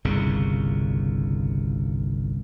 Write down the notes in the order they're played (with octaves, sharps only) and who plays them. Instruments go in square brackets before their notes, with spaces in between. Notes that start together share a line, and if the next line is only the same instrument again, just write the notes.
[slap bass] G1 C2 A#2 C#3